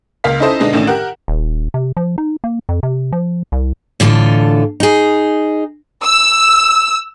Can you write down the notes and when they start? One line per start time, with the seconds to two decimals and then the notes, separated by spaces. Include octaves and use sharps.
0.24 C#2 A#3 F5 B6
0.40 C#4 D#4 E4 A4 C5 D#5
0.60 B2 D3 G#3 D4 D#4
0.73 A1 A2 D#3 C#4 D4 E7
0.87 G4 A#4 F#5
1.28 D#1
1.74 C3
1.97 F3
2.18 D#4
2.44 A#3
2.69 F2
2.83 C3
3.12 F3
3.52 C2
4.00 A2 D3 E3 F4 A4
4.80 D#4 G#4
6.04 E6